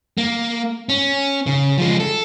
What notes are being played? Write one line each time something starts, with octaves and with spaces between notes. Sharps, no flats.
A#3
C#4
C#3
F3 G#3
A4